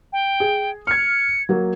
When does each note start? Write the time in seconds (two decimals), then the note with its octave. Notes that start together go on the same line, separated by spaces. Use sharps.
0.13 G5
0.40 G#4
0.87 F6 G#6 C#7
1.49 F#3 A#3